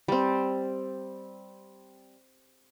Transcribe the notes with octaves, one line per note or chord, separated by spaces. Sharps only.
G3 C4